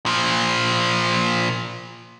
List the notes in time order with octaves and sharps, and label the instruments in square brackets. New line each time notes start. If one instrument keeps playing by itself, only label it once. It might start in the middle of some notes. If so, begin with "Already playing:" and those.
[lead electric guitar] A#2 F3